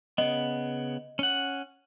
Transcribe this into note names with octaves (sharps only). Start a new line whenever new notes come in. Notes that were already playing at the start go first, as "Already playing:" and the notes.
C#3 B3 D#5
C#4 F#5